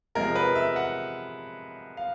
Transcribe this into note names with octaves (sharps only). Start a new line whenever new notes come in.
C3 F3 G#3 A#4
B4
E5
F#5
F5